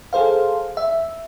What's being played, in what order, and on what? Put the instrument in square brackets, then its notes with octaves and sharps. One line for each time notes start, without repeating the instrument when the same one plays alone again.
[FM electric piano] G#4 A4 C5 F5
E5